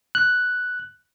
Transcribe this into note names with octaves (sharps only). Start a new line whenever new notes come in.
F#6